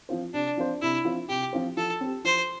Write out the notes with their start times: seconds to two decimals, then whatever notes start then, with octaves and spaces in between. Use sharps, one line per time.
0.09 F3 C4 F4 C5
0.33 C3 D4
0.57 F3 C4 F4 C5
0.82 C3 E4
1.05 F3 C4 F4 C5
1.29 C3 G4
1.53 F3 C4 F4 C5
1.77 F3 A4
2.01 C4 G4
2.24 F3 C5